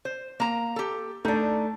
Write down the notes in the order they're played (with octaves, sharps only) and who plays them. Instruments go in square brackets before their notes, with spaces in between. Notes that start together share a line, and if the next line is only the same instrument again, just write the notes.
[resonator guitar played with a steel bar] C5
A#3 A#5
G4 A4
[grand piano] A3 [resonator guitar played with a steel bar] D4 D#4